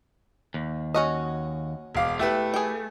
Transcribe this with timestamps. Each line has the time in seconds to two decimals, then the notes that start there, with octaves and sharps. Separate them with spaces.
0.54 D#2
0.94 C#4 F#4 D#5
1.95 E1 F5 D6
2.19 A3 E4 G4 B4
2.54 G#4 G5